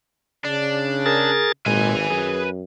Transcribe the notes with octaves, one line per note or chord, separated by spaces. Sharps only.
C#3 D4
G#4 A#4 A6
G#1 A#2 G#3 B4 G#5
F#2 G#4